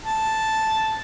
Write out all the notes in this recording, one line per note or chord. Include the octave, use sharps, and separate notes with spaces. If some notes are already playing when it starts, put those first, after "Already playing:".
A5